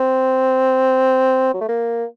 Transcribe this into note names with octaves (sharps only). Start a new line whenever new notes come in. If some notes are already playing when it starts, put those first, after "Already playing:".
Already playing: C4
F#3
A3
A#3